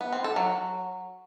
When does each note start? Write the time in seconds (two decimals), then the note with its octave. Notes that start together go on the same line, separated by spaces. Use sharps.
0.01 B3
0.12 C4
0.24 A4
0.36 F#3